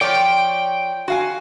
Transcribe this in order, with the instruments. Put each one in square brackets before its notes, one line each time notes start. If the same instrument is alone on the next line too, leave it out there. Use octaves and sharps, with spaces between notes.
[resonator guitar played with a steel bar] F3 C#5 D5 [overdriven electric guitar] G5
[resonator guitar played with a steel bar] F#4 F5 G#5